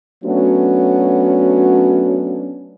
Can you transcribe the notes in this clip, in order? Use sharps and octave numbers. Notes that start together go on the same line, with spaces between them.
F#3 A3 B3 C#4 D4 F#4